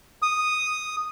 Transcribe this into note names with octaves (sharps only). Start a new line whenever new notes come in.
D#6